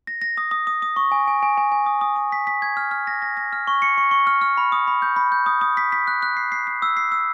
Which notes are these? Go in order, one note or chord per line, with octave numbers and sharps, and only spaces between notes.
A#6
A#6
D#6
D#6
D#6
D#6
C#6
G#5
G#5
G#5
G#5
G#5
D#6
D#6
D#6
B6
B6
G#6
F6
F6
A#6
A#6
A#6
F6
C#6
C#7
C#6
C#6
F6
F6
B5
D#6
B5
G6
B5
G6
D#6
D#6
B6
B6
F#6
F#6
C7
C7
C7
E6
C7
E6